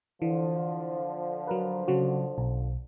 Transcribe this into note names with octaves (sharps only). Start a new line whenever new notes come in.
D3 E3 F3
F#3 A#4 B4
C#3 F#3 F#4
B1